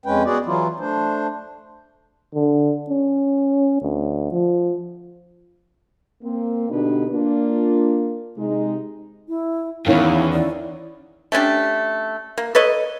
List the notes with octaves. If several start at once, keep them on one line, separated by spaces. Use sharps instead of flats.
F2 G#3 C#4 B4 G5
B3 F#4 G#4 D5
E3 F#3 E4 F4
A3 D4 C5
D3
C#4
D2
F3
A#3 C4
B2 D3 D4 D#4 G4 B4
A#3 D4 F4
C3 G#3 D#4
E4
E2 G2 D#3 C#4 E4 C#5 F5
E4 D5
A3 C#4 D4 G4
A#3
A4 B4 C#5 D#5